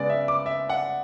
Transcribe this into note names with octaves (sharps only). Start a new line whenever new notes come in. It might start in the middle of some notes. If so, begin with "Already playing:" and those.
Already playing: C#3 G#3 B3 D5
E5
D6
E5
F#5